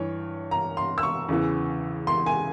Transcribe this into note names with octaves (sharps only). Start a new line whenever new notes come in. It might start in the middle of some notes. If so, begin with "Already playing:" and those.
Already playing: G2 E3 C#5
A#5
C6
E6
C#6
E2 C#3 E3
C6
G#5